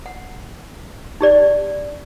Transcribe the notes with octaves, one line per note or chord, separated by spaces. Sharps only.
F#5
D#4 G4 D5